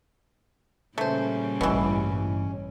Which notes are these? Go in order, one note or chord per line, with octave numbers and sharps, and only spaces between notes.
A#2 C#3 G3 A3 C#4 C5
A1 G2 B2 E3